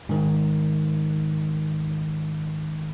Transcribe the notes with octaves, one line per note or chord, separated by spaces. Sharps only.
G#2 D#3